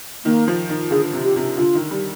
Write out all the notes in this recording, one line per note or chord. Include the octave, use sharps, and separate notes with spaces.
D#3 A#3
F3
D#3
D3 G#4
C3
G4
C3
D3 F4
D#3
G3